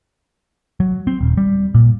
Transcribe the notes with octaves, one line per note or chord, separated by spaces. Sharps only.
F#3
C4
D#1
G3
A#2